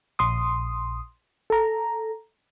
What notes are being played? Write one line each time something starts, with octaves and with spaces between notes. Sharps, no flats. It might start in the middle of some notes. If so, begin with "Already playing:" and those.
A#1 C6 D#6
A4 A#5